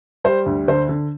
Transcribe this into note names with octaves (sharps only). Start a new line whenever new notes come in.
G3 C5
D2
D3 C5
D3